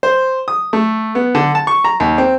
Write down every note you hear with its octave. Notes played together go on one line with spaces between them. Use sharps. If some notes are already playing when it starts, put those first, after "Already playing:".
C5
D#6
A3
B3
D3
A5
C#6
A#5
D#2
C4